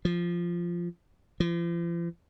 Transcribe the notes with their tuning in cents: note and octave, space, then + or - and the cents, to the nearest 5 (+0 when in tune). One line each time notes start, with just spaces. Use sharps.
F3 -10
F3 -45